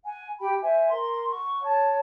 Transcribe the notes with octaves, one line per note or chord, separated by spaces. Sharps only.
F#5 G#5
G4 G5 B5
C5 E5 G#5
A#4 C6
F#5 C#6
C#5 A5